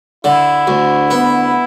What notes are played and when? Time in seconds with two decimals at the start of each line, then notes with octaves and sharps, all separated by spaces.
0.24 D3 E4
0.67 D2
1.10 B3